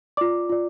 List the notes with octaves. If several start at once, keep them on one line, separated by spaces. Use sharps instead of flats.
F4 D5 D6
F4 D5